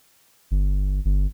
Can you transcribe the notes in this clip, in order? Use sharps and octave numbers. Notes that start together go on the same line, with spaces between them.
G1
G1